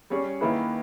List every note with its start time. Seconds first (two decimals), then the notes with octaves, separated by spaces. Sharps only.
0.10 G3 C#4 G#4 C#5
0.41 D#3 A#3 E4 G#4 B4